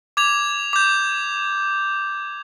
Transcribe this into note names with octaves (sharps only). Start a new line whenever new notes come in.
D6 G#6 F7
D6 G6